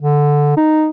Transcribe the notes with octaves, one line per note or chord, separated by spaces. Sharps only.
D3
D#4